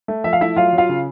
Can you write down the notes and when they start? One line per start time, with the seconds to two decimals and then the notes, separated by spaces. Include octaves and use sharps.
0.08 A3
0.24 F3 E5
0.33 F5
0.41 A3 E4 E5
0.56 F#3 F4 F5
0.73 F#3
0.78 F4 F5
0.89 C#3